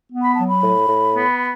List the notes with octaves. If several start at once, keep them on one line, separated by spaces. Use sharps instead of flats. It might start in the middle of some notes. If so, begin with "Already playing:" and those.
B3
B5
F#3 A5
B5
A2
A2
B3